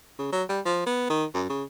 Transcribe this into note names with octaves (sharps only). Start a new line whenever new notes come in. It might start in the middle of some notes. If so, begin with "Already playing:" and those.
C#3
F#3
G3
F3
B3
D#3
F#2
C#3